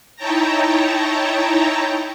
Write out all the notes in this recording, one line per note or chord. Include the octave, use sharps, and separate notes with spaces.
D#4 E4 C#5 G5 A5 A#5